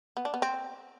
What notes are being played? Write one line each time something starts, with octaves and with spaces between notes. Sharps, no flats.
B3
D4
B3
C4